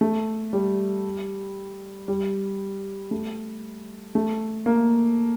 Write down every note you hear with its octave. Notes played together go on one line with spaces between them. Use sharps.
A3
G3
G3
A3
A3
A#3